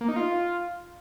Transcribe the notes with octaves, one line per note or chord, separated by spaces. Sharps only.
A#3
D#4
F4